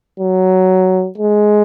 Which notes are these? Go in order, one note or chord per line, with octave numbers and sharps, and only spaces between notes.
F#3
G#3